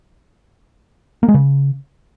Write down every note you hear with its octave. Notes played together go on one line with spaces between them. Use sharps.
A#3
G#3
C#3